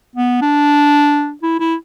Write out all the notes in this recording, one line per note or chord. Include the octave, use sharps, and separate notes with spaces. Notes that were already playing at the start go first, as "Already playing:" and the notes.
B3
D4
E4
E4